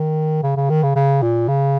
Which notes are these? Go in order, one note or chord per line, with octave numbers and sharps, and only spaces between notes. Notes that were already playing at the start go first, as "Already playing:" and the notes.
Already playing: D#3
C#3
C#3
D#3
C#3
C#3
A#2
C#3